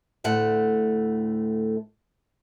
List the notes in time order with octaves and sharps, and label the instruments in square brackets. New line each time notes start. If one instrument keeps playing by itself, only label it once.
[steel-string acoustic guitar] D2 A2 A3 F#5